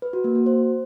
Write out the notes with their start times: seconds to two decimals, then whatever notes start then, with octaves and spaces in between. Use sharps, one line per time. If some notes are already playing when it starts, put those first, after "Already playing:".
0.02 B4
0.13 F#4
0.24 A#3
0.35 F#4
0.46 C5